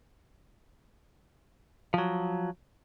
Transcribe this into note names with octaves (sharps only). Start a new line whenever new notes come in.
F3 F#3